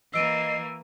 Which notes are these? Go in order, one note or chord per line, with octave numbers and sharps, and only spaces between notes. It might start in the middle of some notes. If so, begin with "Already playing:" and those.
E3 A#3 D#5 E6 C7 D7 D#7